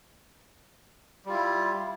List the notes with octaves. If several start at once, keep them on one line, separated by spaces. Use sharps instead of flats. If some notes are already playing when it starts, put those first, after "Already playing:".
G3 E4 F4